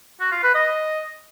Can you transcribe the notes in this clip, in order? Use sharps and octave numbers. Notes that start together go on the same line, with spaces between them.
F#4
F4
B4
D#5